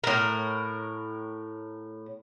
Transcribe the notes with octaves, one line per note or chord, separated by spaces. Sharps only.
A2 A#4